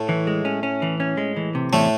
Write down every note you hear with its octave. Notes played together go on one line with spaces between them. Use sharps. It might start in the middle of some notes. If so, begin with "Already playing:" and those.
Already playing: A2 A3
E3
G#3
C#4
C#4
E3
C#4
G#3
E3
C3
E2 A2 A3